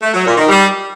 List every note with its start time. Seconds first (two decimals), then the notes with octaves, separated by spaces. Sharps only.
0.03 A3
0.14 F#3
0.26 A#2
0.37 D#3
0.49 G3